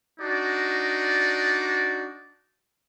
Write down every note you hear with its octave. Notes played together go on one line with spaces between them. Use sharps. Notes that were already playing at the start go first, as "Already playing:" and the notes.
D4 D#4 F#4 D5